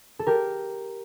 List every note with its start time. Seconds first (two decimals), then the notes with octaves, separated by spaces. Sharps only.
0.19 A4
0.27 G4 A#4